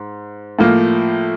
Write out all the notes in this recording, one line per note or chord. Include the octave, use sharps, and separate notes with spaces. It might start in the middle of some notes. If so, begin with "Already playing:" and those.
Already playing: G#2
A2 F3 A#3